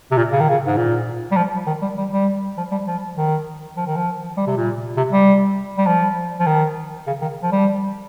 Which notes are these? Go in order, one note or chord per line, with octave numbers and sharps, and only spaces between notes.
C3
A#2
C#3
D#3
C#3
G#2
A#2
G3
F3
D#3
G3
G3
G3
F3
G3
F3
D#3
F3
D#3
F3
G3
C3
A#2
C3
G3
G3
F3
F3
D#3
C#3
D#3
F3
G3